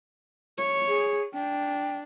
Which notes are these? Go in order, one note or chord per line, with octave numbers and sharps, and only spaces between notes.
C#5
G#4
D4 G5